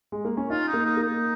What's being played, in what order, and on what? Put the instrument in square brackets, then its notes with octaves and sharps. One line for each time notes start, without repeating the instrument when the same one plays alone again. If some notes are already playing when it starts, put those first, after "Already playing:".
[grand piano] G#3
A#3
C#4
[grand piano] D#4 [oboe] F4
[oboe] D#4
[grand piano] A#3
[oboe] D#4
[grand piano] A#3
[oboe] D#4